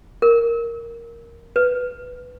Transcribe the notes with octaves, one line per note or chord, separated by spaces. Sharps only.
A#4
B4